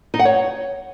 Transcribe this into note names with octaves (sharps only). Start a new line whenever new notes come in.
D#4
F#5
C#5